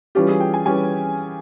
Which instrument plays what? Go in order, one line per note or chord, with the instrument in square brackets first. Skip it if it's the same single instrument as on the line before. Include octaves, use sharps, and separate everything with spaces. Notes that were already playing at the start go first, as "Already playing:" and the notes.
[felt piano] E3 G3 C#4 G4 [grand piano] F4
[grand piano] G#4
G5
G#5
[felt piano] E3 G3 C#4 G4 [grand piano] G#5